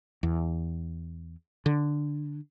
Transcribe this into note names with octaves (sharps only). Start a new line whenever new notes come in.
E2
D3